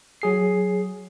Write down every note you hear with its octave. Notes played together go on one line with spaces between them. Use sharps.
F#3 G#4 C7